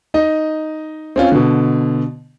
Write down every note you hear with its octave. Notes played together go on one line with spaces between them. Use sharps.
D#4 D#5
C4 C#4 F4
B2 D3